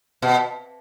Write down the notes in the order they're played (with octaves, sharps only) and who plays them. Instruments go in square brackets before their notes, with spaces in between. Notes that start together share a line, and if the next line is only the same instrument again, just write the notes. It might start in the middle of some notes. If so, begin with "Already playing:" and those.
[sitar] B2